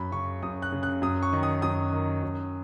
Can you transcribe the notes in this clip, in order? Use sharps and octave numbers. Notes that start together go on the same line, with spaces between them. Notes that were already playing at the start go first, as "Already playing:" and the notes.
Already playing: F#2 B5
C#3 C#6
F#2 D#6
F#6
C#3
F#6
F#2 D#6
C#6
D#3
D#6
F#2 D#6
D#3
F#2